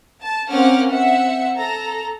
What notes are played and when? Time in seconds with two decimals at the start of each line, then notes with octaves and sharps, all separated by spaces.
0.21 A5
0.51 A#3 C4 C#4 F#5 D6 F6
0.89 C4 E5 F#5 C#7
1.57 A4 A#5